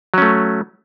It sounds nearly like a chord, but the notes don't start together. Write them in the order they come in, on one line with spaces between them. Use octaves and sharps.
F#3 C#4 A3